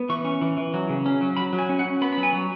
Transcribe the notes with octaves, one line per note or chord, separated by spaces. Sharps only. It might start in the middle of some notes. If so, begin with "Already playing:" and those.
Already playing: B3
E3 C#6
C#4
E3
E3
F#3
C#3
C#4
F#3
F#3 B5
F#3
G#5
C#4
F#5
C#4
B3 B5
F#3 B5
G#5
F#3